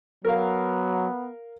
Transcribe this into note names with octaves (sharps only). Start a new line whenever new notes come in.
F#3 B3 A#4 F5